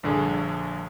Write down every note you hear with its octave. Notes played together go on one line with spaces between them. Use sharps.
A#1 G2 D3 G#4